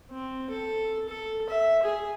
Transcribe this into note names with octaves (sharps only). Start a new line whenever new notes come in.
C4
A4
A4
E5
G#4